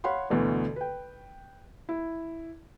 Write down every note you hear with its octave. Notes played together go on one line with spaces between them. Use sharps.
C#5 F5 F#5 B5 C6
D2 B2 D3 E3
B4 G5
E4